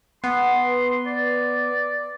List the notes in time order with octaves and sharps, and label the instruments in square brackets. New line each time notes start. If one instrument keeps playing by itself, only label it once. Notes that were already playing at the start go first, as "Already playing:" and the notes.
[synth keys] B3 [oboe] C6
[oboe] D5